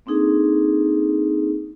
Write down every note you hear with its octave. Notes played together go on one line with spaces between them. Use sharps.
A#3 C4 D4 D#4 G#4 A4